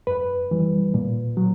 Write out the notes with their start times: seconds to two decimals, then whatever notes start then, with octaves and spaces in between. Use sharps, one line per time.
0.07 F#2 B4
0.51 E3 G3
0.94 A#2
1.37 F#3